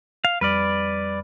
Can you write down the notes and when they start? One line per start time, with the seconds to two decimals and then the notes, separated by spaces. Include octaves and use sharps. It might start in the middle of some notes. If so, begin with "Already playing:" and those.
0.25 F5
0.41 F2 G3 B4 D5 F6